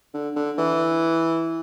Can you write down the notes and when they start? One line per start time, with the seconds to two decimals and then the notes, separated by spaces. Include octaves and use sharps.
0.14 D3
0.36 D3
0.58 E3